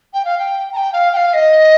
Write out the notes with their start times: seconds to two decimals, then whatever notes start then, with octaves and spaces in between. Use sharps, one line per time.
0.14 G5
0.25 F5
0.38 G5
0.73 A#5
0.77 G5
0.93 F5
1.13 G5
1.17 F5
1.34 D#5